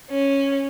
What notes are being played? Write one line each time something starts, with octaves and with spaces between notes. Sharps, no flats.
C#4